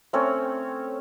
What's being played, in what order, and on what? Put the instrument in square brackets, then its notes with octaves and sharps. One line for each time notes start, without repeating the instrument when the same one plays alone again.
[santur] A3 C4 C#4 C#5